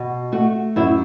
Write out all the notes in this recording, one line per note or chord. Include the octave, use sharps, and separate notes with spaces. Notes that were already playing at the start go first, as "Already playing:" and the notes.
Already playing: B2
A3 F#4
F#2 E4